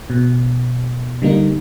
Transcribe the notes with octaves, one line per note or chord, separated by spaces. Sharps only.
B2
D3 G3 A#3 D#4